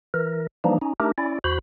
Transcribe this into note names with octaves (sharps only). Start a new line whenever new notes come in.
E3 A#4
E3 F3 G3 A#3 D4 D#4
C#4 D#4
A3 D4 D#4 G4 A#4
C#4 E4 D5
E2 F#4 C5 B5